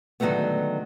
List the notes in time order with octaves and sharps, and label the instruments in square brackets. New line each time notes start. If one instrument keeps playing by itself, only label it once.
[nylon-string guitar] D3 D#3 F#3 G#3 A3 B3